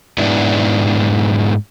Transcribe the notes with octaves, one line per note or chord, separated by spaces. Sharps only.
G#2 B3 D4 E4